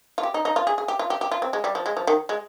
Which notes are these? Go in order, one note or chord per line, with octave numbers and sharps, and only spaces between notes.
F4
G4
D#4
D#4
F4
G#4
G#4
G4
F4
G4
G4
F4
C4
G#3
G3
F3
G#3
F3
D#3
G#3